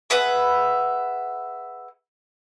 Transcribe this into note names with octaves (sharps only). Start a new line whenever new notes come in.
G#4 B4 E5 F#5